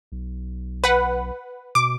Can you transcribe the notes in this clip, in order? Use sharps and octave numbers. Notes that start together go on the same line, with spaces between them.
B1
B4 F#5
B2 D6